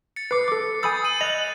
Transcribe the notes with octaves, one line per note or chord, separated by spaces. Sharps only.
A6 C#7
B4 D6 C7
A4 D6
G#5 B5 D#6 E6 G6 A6
D#7 F#7
D#5 F#6 F7